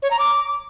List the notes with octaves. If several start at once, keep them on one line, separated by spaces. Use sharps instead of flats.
C#5
A#5
D6